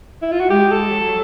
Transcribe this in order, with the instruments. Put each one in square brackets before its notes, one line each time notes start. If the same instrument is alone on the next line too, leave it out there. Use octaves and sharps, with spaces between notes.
[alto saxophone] E4
F4
F#4
[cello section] G#3 [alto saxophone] G4
[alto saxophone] A4
[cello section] F#3